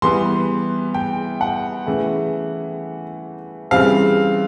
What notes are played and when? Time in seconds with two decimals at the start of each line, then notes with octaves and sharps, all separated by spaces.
0.02 E3 G3 B3 C6
0.94 G5
1.41 F#5
1.87 C#3 E3 A3
3.71 C#3 E3 G3 C4 F5